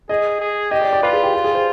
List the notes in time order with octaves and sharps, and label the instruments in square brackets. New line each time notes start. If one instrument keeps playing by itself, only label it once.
[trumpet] G#4 [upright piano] D#5
[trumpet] G#4
[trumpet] G4 [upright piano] D#5
[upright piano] D5
D5
[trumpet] F4 [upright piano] B4
[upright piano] G#4
G4
G4
G#4
C5